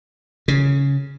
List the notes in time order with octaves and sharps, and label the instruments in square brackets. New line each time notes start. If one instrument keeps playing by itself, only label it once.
[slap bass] C#3